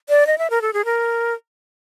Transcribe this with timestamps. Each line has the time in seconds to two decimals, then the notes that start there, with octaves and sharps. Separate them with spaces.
0.09 D5
0.27 D#5
0.38 E5
0.50 A#4
0.62 A4
0.73 G#4
0.85 A#4